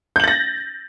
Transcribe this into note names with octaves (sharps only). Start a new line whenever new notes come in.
G6 A6 A#6 F#7